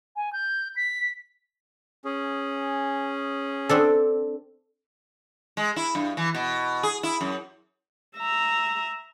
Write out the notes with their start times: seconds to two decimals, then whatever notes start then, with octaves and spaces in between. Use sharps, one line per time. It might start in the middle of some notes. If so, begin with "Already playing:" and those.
0.16 G#5
0.33 G6
0.76 B6
2.05 C#4 G#4
3.69 C4 D4 A4
5.57 G#3
5.76 E4
5.95 G2
6.17 E3
6.35 B2
6.83 G#4
7.03 E4
7.21 F#2
8.16 E5 A#5